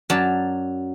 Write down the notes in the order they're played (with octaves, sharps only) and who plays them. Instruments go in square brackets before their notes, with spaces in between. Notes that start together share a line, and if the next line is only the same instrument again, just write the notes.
[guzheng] F#2 F#3 D5 A5